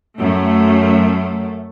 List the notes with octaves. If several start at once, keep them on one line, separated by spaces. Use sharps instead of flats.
F#2 A3